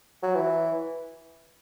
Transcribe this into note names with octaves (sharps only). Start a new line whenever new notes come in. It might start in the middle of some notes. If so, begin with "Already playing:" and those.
F#3
E3